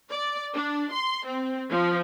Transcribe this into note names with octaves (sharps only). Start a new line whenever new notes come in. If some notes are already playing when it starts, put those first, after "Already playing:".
D5
D4
C6
C4
F3